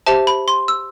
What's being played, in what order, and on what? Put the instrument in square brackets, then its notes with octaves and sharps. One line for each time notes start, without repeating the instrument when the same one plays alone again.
[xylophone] G4 C5 E5 A5
B5
C6
E6